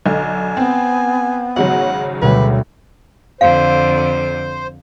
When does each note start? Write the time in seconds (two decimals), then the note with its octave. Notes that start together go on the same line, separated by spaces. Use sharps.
0.06 B1 D3 G#5
0.57 B3 C4
1.56 G#1 C#3 F#3 F#4 F#5
2.22 D2 B2 G3 B4
3.41 F2 D3 C5 F5